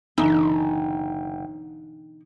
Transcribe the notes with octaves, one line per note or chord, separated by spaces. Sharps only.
F#1 B2 D3 E3 D#4